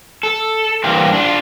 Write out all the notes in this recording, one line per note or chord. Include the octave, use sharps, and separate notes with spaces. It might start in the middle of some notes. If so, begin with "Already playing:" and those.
A4
E3 G3 A#3 C4 D4
D4 F4